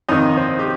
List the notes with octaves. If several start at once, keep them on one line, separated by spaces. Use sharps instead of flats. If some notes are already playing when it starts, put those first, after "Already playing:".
F2 C3 D#3 D#4 D#5
C4 C5
G4